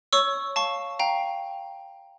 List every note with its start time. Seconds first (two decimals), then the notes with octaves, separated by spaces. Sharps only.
0.13 C#5 C#6 E6
0.56 F5 A5 C#6
0.99 F5 G5 A#5